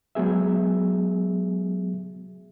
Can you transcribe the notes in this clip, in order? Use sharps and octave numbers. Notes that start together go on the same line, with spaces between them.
F#3 G#3 B3 G#4 E5